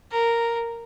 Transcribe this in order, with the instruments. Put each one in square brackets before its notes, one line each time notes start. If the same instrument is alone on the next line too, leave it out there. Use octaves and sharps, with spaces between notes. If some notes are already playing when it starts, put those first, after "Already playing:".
[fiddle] A#4